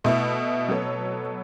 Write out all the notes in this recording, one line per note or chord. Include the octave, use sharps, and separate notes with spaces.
B2 A3 E4
F#3 B3 A4 C#5